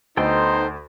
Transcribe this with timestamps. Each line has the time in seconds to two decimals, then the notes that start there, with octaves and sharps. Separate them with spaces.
0.17 D2 B3 D#4 A4 C5 G5 C6